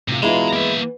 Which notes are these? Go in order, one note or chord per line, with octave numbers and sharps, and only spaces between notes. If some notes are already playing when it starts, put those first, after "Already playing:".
A2 C3 F4
B2 E3 G#3 E4 F4 A#5 C6
E3 A#3 B3 E5